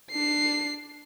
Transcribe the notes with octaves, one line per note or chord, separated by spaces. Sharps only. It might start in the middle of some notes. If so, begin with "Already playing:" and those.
D4 C7